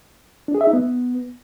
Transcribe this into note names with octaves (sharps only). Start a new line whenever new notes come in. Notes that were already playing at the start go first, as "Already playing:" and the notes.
D4
G#4
E5
D#4
B3